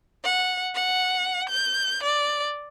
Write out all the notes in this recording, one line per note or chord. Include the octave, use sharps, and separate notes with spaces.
F#5
F#5
G6
D5